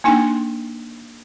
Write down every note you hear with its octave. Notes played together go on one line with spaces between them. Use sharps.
A#3 D4 D#4 G5 C6